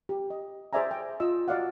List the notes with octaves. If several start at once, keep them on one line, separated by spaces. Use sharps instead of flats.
G4
D#5
G#4 C5 D5 E5 G#5 A#5
G5
F4 D#5 E6
F#4 D5 D#5 F5 F#5